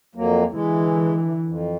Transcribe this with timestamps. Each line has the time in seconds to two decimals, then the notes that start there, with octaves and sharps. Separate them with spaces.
0.15 F2 F#3 A#3
0.52 D3 E3 G#3
1.46 F2